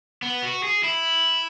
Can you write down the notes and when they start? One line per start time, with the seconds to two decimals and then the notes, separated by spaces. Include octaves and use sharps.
0.23 B3
0.43 F#4
0.63 G#4
0.84 E4